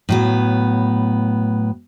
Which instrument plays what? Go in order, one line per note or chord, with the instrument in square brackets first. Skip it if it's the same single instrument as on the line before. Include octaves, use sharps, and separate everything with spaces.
[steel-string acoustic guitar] A2 F#3 B3